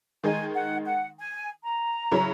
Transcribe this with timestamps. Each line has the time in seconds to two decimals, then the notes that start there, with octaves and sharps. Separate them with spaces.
0.24 D#3 G#3 D#4 G#5
0.55 F#5
0.86 F#5
1.18 G#5
1.64 A#5
2.11 C#3 F#3 C#4 E4